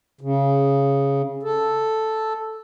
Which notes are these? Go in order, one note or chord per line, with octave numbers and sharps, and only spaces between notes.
C#3
A4